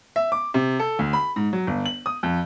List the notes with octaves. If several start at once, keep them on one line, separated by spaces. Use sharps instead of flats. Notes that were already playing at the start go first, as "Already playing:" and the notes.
E5
D6
C3
A4
D2
B5
G#2
F#3
G1
F#7
D#6
F2